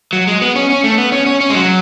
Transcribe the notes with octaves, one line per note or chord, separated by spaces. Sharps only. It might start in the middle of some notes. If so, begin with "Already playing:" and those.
F#3
G#3
B3
C#4
C#4
A3
B3
C#4
C#4
C#4
G#3
F#3